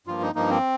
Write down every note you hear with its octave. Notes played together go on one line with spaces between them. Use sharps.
G2 F3 A#3 F4
D#4
G2 F3 A#3 D#4
C4